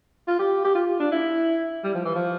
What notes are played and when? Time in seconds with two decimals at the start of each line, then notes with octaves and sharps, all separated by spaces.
0.28 F4
0.39 G4
0.65 G4
0.75 F4
1.00 D4
1.12 E4
1.84 G3
1.95 F3
2.05 E3
2.15 F3